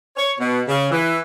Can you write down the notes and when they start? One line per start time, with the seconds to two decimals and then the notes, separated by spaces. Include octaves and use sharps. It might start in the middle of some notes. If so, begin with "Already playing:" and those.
0.17 C#5
0.39 B2
0.68 C#3
0.91 E3